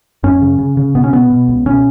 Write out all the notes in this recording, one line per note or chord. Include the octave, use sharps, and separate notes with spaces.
F#2 C#4
C#3
C#3
C#3
B2 B3
C#4
B2 B3
B2
C#2
B2 C#4